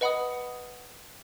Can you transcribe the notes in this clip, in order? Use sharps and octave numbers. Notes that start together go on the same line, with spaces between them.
B4 D#5 F#5 B5 D#6